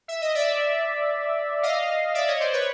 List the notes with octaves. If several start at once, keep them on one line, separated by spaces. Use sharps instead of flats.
E5
D#5
D5 E5
D#5 F5
D5 E5
C#5 D#5
C5 D5
B4 C#5